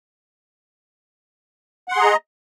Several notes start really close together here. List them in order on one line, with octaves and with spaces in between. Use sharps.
F#5 C6 G#4 A#5 D#5